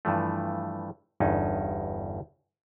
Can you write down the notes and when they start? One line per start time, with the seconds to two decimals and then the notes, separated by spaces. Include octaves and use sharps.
0.05 G2 E3 F3 A3
1.20 G1 E2 G2 C#4 D#4